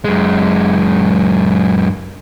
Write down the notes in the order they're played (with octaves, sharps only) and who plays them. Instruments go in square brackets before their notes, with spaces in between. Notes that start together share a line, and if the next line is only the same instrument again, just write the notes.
[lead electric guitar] F#2 G#3